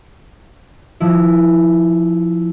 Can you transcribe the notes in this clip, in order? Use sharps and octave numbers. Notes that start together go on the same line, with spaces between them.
F3 E4